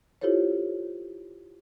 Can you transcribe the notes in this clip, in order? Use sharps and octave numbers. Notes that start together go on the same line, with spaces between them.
E4 F4 G4 A4 C5 C#5